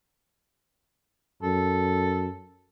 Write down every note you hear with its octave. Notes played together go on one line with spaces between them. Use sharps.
F#2 A4